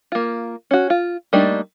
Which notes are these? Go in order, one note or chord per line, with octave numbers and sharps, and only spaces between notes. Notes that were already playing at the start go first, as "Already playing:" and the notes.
A#3 F4
C#4 F#4
F4
G3 A3 A#3 D4 D#4